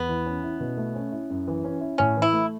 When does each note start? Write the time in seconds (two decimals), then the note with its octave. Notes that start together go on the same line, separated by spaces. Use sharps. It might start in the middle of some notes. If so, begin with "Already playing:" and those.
Already playing: E2 B3
0.09 E3
0.26 C#4
0.43 E4
0.60 B2
0.77 A3
0.95 C#4
1.12 E4
1.30 F#2
1.48 E3
1.64 C#4
1.81 E4
1.98 A2 C#4
2.17 E3
2.22 E4
2.33 A3